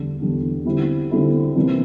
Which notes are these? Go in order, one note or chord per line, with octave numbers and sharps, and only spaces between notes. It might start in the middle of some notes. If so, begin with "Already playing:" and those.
Already playing: E2 D3 G3 D4
E2 D3 G3 D4
D3 G3 C4 E4
D3 G3 C4 E4
C3 E3 G3 A#3 D4